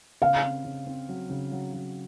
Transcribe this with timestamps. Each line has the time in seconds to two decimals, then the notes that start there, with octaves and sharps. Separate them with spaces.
0.22 C#3 F5
0.43 C4
0.65 C#3
0.87 C4
1.09 F#3
1.30 C#3
1.52 F#3
1.74 F#3